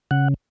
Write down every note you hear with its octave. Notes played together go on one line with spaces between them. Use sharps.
C#3 F#5